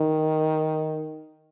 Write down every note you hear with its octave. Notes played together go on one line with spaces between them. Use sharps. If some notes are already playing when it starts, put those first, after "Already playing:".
Already playing: D#3